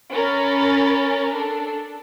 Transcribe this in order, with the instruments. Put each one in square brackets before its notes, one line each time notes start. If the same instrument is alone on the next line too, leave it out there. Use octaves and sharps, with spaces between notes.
[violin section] C#4 A#4 B5 A6
D4 A4